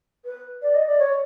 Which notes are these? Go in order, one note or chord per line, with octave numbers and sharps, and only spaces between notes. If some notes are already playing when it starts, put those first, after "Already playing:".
B4
D5
D#5
D5
C#5